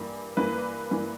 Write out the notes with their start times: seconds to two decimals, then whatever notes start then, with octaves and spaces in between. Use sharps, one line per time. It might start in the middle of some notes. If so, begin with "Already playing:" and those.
Already playing: G2 E3 A#3
0.37 G2 E3 A#3 B4
0.91 G2 E3 A#3